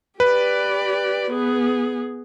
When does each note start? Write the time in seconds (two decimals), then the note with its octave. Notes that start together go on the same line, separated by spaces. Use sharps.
0.20 G4 B4 D5
1.32 B3 G#4